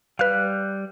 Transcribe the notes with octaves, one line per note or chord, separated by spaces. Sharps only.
G3 B4 F5 F#6